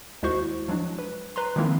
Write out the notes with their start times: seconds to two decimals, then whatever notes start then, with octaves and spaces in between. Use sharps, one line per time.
0.23 D#2 G#3 E4 F#4 C5 C#6
0.68 F3 F#3 G#3 D4
0.99 B4
1.36 B4 A#5 C6
1.56 D#3 F3 G#3 A#3 C4 E4